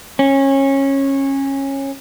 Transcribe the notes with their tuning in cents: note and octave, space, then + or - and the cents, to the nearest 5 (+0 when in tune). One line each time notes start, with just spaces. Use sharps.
C#4 -20